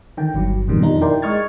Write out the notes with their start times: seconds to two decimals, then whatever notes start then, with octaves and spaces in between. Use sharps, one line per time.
0.17 D3 D#3 G5
0.34 G1 G2 F#3
0.67 F2 G#2 B2 D#3 G3
0.80 F2 D#3 F3 D4 D#4
1.01 E4 A#4 D5 G5 C6
1.22 G#3 D#5 C#6 F6 G#6 A6